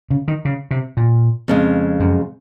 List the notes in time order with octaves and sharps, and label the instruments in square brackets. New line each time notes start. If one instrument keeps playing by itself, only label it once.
[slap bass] C#3
D#3
C#3
C3
A#2
[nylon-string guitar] F2 C#3 G#3
[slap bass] F#2